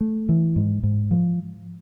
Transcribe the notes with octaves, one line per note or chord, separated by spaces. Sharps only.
A3
E3
G#2
G#2
F3